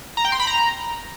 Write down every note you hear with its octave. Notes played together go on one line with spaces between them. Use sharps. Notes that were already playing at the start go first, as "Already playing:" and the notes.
A#5
G5
C6
B5
A#5